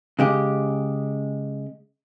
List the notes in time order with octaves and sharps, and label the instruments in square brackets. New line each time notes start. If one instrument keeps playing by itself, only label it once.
[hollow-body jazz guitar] C#3 G#3 G4